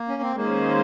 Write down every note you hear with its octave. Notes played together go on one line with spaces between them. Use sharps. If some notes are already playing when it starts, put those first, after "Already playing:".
Already playing: A#3
C#4
C4
D#3 G#3 A#3 C#4 G#4 C5